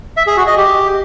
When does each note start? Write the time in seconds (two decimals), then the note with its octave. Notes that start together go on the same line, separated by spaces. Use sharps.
0.17 E5
0.27 G#4
0.37 F#4
0.47 D#5
0.57 G4